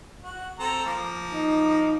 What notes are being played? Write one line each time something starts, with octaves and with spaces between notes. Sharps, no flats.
F#4
C4 A4 A#5
F3 A#3
D#4